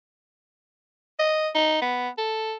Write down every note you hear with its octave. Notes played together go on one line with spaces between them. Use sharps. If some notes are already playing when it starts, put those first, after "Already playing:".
D#5
D#4
B3
A4